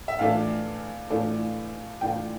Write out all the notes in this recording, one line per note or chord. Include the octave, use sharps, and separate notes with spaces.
E5
A2 E3 A3 D4 F4 F5
A2 E3 A3 D4 F4
A2 E3 A3 D4 F4 G5